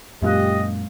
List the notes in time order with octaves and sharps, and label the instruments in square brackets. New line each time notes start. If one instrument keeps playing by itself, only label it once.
[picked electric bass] F#2 A#2 [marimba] G#3 F5 F#6 [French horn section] G4 [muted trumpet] D#5